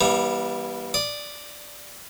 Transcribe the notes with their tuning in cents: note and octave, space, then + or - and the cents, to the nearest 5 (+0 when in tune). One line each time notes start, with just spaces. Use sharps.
E3 +0 G3 +0 A#3 +45
D5 +0 D#6 -20